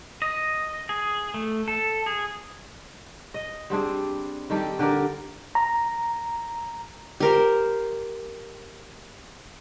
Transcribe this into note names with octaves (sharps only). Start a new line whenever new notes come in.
D#5
G#4
A3
A4
G#4
D#5
G3 C4 D4 G#4
D#3 G3 G4 A4
D3 G4 A#4 D5
A#5
G4 A#4 C5